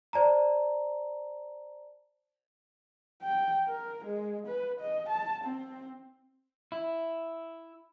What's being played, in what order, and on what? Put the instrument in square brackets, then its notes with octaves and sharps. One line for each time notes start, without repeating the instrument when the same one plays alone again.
[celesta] C5 D5 A5 A#5
[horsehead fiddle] G5
A#4
G#3
B4
D#5
A5
C4
[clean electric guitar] E4